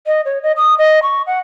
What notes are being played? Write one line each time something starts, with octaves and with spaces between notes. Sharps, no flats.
D#5
C#5
D#5
D#6
D#5
C#6
F#5